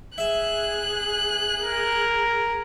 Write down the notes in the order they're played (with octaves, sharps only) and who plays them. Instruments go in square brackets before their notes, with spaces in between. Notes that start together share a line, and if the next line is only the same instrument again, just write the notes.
[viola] G#4 [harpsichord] E5 [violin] F#6
[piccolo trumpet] A#4